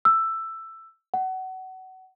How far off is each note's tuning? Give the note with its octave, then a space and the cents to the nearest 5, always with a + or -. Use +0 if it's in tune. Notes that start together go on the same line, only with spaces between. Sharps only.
E6 +10
F#5 +25